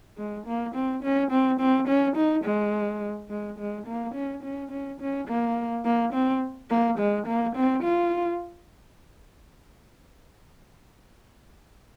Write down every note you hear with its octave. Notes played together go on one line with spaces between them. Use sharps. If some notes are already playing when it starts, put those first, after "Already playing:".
G#3
A#3
C4
C#4
C4
C4
C#4
D#4
G#3
G#3
G#3
A#3
C#4
C#4
C#4
C#4
A#3
A#3
C4
A#3
G#3
A#3
C4
F4